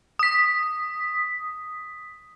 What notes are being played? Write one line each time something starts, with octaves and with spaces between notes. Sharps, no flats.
D#6 B6